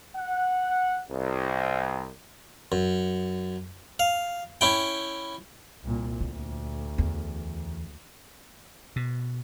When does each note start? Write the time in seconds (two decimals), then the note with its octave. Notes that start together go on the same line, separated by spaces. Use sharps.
0.17 F#5
1.09 C2
2.72 F#2
3.99 F5
4.61 C#4 E4 G5
5.83 C2 A#2
6.21 D2 A#2
6.98 E2
8.96 B2